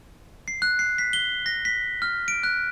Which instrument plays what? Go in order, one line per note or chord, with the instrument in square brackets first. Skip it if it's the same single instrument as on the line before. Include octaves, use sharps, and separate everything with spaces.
[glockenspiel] C7
F#6
C7
B6
G7
A#6
B6
F6
D7
F#6